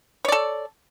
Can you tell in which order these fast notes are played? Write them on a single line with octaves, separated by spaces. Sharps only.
C#5 D5 A4